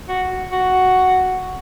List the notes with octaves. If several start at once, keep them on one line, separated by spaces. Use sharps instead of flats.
F#4
F#4